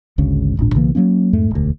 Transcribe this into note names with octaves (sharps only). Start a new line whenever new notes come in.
G#1 D2 G#2 C#3
D1 G#1 A#2 D4
B1 C#3 E3 A#3
F#3 G3 A#3 C#4
F2 G#2 A3
E1 D2